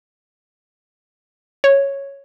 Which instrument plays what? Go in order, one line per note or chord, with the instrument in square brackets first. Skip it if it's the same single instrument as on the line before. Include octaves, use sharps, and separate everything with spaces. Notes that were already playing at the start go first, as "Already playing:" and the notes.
[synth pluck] C#5